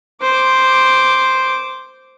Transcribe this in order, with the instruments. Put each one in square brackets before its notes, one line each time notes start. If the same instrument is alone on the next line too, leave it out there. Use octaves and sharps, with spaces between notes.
[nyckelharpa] C5 D6